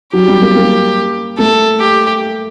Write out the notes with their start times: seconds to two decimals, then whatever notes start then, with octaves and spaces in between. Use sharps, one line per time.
0.13 F#3 G4
0.28 G3
0.41 A#3
0.55 A#3
1.38 A3 A4
1.80 G4